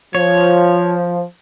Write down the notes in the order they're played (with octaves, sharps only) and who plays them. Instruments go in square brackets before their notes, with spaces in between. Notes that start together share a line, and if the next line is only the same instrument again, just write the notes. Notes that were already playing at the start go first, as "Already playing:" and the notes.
[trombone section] F3 [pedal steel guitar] C#5